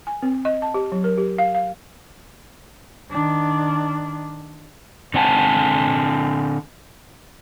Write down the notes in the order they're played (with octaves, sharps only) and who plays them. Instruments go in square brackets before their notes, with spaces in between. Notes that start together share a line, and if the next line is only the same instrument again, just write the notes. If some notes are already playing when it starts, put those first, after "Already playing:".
[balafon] G#5
C4
D#5
A5
G4
F#3
A#4
G4
F5
F5
[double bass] D#3 D4
[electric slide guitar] D3 C4 F#5 G#5 A5